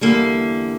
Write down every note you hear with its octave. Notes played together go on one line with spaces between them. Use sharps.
E2 D3 G3 A#3